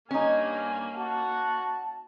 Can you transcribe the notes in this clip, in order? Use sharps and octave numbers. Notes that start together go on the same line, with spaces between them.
G2 A#3 C#4 D#4 G#5
F#4 F#5 A5